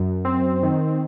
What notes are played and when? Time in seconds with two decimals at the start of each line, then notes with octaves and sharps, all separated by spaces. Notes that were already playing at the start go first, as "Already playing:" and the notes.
Already playing: F#2
0.25 C4
0.63 D#3